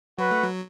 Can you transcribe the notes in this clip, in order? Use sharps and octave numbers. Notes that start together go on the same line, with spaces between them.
F#3 F#4 B4
A3
F#3